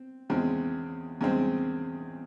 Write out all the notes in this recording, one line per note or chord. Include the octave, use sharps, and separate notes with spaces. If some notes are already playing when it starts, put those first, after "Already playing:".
Already playing: C4
E2 C#3 G#3 C4
E2 C#3 G#3 C4